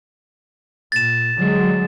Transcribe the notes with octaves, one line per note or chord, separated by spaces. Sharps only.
A#2 A6 E7
D3 F#3 G#3